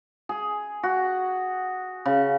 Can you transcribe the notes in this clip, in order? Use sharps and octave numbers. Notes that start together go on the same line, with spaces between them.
G#4
F#4
C#3